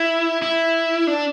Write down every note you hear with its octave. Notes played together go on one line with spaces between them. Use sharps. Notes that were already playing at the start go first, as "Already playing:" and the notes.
Already playing: E4
E4
D4